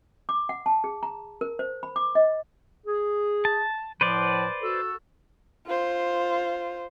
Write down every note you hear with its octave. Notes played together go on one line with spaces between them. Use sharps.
D6
F#5
A5
G#4
A#5
A#4
C5
B5
D6
D#5
G#4
A5
A2 F3 B4 C5 D5
F#4 A4
F4 C5